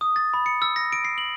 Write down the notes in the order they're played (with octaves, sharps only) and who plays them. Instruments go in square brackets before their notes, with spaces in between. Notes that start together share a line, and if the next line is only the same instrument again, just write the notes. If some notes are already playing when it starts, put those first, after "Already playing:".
[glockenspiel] D#6
A6
B5
C#7
E6
A#6
D7
C7
F#7